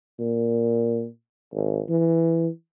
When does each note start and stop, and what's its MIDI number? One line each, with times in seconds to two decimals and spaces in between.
0.19 1.06 46
1.53 1.80 32
1.89 2.48 52